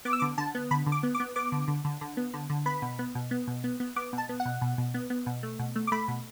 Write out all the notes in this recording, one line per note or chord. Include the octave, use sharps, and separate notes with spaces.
B3 D6
E6
D3 D6
D3 A5
B3
D3 B5
D3
D6
B3
D6
B3
B3 D6
D3
D3
D3
D3
B3
D3
D3
B3 B5
B2
B3
B2
B3
B2
B3
B3
B3 D6
B2
A5
B3
F#5
B2
B2
B2
B3
B3
B2
A3
B2
A3
D6
A3 B5
B2